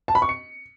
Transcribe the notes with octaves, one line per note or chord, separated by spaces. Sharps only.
A5
B5
C#6
C#7